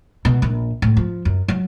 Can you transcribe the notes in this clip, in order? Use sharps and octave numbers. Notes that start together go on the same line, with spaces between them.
B2
A#1
A2
F3
F#2
F#3